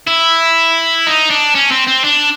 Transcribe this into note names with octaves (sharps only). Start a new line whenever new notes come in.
E4
D#4
D4
C#4
C4
C4
D4